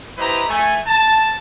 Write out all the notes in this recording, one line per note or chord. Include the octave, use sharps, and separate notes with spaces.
E4 G4 B4 C5 D#5 A#5
A3 G#5
A5